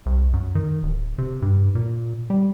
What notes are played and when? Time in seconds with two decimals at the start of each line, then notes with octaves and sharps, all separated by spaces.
0.06 C2
0.33 F#2
0.55 D#3
0.83 D1
1.18 C3
1.42 G2
1.75 A#2
2.30 G3